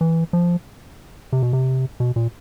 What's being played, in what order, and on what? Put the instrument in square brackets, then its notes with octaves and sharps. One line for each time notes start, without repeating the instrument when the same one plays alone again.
[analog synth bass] E3
F3
C3
B2
C3
B2
A#2